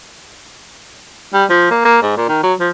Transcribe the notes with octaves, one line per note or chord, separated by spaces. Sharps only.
G3
F3
A#3
A#3
G#2
A#2
D#3
F#3
F3